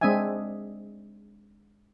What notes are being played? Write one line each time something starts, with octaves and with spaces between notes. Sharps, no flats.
G#3 C4 D4 D#5 E5 G#5